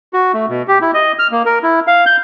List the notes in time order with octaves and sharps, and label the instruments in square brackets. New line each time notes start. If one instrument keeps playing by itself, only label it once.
[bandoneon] F#4
A3
B2
G4
E4
D#5
F6
A#3
A#4
E4
F5
G6